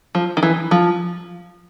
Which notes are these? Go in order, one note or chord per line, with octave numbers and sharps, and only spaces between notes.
F3
D#3
E3
F3